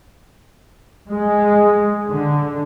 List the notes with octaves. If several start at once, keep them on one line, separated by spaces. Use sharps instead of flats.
G#3
D3